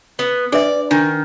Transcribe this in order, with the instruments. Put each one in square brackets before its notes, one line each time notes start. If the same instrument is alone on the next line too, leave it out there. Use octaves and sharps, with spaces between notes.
[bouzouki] B3
[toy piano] D4 B4 E5 [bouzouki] D5
[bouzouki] D#3 [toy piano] D4